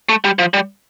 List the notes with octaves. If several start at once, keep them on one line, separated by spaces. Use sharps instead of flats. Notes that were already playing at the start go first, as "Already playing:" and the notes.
A3
G3
F3
G3